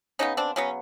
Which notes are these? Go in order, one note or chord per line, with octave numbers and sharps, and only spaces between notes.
C#3 F#3 B3 C#4 D#4
C4 D4
C#3 F#3 B3 C#4